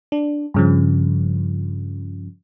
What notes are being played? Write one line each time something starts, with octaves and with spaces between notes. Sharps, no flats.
D4
G2 C#3 F3